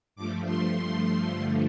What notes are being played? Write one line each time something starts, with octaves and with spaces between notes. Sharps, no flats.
G2 F3 A3 D6
C6
C6
G2 D3 F3 A3 C6